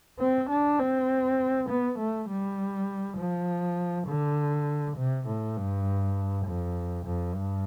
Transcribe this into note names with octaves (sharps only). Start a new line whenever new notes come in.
C4
D4
C4
B3
A3
G3
F3
D3
C3
A2
G2
F2
F2
G2